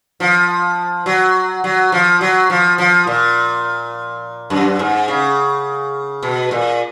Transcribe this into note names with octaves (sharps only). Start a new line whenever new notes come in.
F3
F#3
F#3
F3
F#3
F3
F3
A#2
F#2
G#2
C#3
B2
A#2